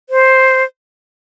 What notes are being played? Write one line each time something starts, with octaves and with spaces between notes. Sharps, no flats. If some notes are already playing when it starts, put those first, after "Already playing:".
C5